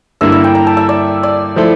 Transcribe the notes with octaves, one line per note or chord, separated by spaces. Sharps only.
G2 D3 G3 A#3 E4 E5
E5
G5
A#5
A5
E5
D5
D5
F3 A3 E4 A4 C5